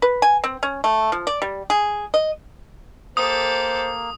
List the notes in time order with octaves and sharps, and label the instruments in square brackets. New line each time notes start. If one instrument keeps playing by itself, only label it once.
[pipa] B4
G#5
C4
C#4
A3
F3
D5
G3
G#4
D#5
[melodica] A#3 [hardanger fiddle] G4 A4 [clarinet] C5 [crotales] D#6